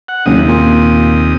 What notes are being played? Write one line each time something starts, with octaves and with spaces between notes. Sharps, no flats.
F#5
F#1 D#2 C3 D#6
A#2